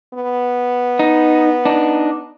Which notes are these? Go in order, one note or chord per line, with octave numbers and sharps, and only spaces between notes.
B3
D#4
D4 D#4